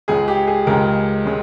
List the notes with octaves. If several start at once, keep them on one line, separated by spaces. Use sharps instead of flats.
C#2 C#3 G#3 G#4
G4
G#4
C#2 C#3 G#3 A#4
C#3 G#3